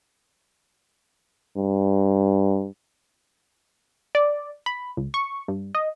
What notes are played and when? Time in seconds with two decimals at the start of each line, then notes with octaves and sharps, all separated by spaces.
1.56 G2
4.15 D5
4.66 B5
4.97 C#2
5.14 C#6
5.48 G2
5.75 D#5